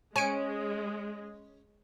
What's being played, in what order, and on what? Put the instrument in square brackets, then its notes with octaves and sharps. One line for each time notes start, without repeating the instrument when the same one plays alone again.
[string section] G#3 [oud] C#4 [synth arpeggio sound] G#5 C#7 D7